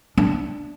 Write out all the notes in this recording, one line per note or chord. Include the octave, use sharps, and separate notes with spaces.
D4